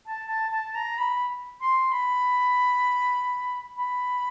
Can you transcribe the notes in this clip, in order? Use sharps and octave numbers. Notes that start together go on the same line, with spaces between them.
A5
A5
A5
A#5
B5
C6
B5
B5